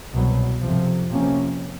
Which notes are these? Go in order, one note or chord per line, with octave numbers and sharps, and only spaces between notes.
C2 B2 F#3
F2 C3 F3
C3 F3 A#3 C#4